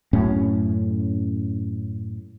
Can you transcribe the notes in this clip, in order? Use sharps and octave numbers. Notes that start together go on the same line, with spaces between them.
F#2 A2 C#4